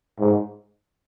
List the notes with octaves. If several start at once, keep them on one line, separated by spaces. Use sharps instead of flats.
G#2